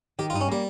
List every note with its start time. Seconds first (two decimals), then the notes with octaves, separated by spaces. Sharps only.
0.19 D#3 G4
0.30 F4
0.33 G2 D#4
0.41 C#4
0.48 G3 A#3